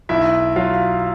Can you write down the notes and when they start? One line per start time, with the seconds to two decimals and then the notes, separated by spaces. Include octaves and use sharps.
0.09 B1 E4 E5
0.56 F#3 F4 F5